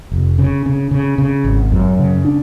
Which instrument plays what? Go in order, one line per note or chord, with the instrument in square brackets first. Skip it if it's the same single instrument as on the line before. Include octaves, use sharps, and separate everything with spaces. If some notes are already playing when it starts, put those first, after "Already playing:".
[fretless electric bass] F1
C#3
C#3
C#3
C#3
G#1
F#2
C#3
D4